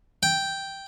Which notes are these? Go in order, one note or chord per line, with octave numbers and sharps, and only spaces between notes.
G5